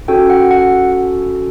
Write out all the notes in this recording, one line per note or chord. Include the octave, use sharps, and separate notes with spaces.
C#4 F#4 A4 G5
F#5
F#5